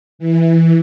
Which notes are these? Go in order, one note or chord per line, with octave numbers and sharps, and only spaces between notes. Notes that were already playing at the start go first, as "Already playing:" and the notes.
E3